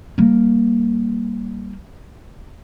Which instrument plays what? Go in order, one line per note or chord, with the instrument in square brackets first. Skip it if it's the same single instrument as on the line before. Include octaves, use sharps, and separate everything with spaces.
[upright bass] G3 A#3